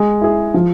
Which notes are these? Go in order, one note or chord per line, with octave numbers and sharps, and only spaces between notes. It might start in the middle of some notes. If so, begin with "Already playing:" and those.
Already playing: G#3
E4 G#4
F3